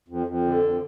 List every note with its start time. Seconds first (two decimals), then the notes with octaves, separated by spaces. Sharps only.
0.08 F2
0.26 F2
0.45 D3
0.63 F2